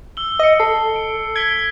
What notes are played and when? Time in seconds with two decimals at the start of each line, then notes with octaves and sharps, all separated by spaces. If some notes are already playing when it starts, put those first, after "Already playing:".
0.17 E6 F#7 G7
0.39 D#5 E6 C#7
0.60 A4 C7
0.96 D7
1.36 G#6 B6 D7 G7